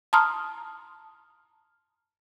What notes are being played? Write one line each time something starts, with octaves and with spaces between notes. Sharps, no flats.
A5 A#5 C6 D#6 F6